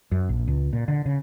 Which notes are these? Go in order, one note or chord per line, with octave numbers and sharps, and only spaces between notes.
F#2
A#1
C#2
A#2
D3
C#3